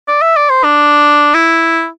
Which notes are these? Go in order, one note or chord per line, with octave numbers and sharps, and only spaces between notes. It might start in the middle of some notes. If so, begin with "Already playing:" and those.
D5
E5
D5
C5
D4
E4